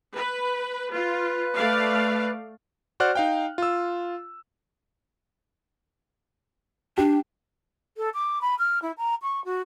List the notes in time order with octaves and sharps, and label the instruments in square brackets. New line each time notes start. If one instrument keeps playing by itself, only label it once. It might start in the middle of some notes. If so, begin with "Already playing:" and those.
[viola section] B4
[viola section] F4 [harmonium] B4
[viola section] A3 D5 F5
[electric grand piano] F#4 C5 D5 F#5 F6 F#6
D#4 F5 G5
F4 E6
[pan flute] D4 [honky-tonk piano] G4
[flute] A4
D6
B5
F6
E4
A#5
C#6
F#4